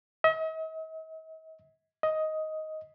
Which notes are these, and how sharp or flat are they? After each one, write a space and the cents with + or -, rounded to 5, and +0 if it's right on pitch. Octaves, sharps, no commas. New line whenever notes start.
D#5 +45
D#5 +10